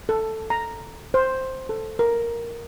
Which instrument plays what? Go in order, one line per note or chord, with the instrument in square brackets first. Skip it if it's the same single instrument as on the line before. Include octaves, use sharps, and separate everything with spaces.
[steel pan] A4
A#5
C5
A4
A#4